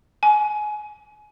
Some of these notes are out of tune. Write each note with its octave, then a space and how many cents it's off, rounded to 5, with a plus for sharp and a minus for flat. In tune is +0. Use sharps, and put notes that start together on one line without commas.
G#5 +25